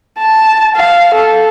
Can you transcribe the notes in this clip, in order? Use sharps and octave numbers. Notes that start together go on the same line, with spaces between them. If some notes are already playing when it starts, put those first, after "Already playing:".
A5
F5
A4